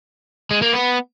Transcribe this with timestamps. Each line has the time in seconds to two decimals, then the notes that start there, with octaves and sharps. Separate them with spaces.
0.51 G#3
0.62 A#3
0.73 B3